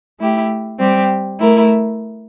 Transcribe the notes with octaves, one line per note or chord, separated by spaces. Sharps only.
A3 E4 G4
G3 C4 G4
A3 E4 A#4